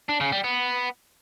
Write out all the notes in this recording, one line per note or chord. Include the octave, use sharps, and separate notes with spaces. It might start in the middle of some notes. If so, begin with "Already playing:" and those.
D4
C#3
G3
B3